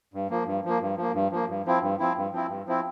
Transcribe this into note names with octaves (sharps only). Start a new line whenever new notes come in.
G2
F3 A#3
G2
F3 A#3
G2
F3 A#3
G2
F3 A#3
G2
F3 C4 E4
G2
F3 C4 E4
G2
F3 C4 E4
G2
F3 C4 E4